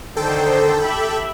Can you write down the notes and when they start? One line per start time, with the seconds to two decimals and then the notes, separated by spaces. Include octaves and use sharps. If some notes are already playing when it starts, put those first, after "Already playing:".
0.16 D3 D#3 A4 C5 G5
0.84 G4 E5 B5